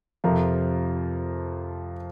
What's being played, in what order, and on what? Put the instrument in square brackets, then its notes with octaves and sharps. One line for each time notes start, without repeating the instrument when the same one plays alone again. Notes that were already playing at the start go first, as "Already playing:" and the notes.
[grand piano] F2 C3 F3 F4 A#4